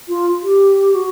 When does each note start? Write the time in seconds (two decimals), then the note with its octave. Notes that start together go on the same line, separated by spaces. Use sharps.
0.09 F4
0.43 G4
0.95 F#4